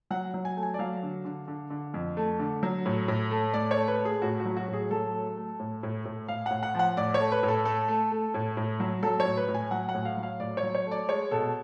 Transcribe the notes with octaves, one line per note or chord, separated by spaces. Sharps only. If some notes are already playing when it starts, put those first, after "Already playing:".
F#3 F#5
F#3
G#5
A3
G#5
D5
F#3 F5
D3
D3
D3
D3
F2
A3
D3
F#3
A2
A2
A3
A2 D5
C#5
A3
B4
A3
G#4
A2 F#4
F#4
F#3
F#4
A2
G#4
F#3 A4
A3
A3
A2
A2
A2
A2 F5
A2 F#5
F#5
F3 F#5
A2 D5
C#5
A3
B4
A2
A4
A3 A4
A3
A3
A2
A2
F#3
F#3 A4
C#5
A2
B4
A2
G#5
F#3 F#5
F#5
A2
F5
F#3
F5
A2 D5
C#5
F#3
C#5
A3
D5
G#3 C#5
B2 A4